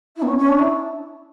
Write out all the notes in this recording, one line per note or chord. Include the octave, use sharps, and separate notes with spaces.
E4
B3
C#4
C#4
D4
E4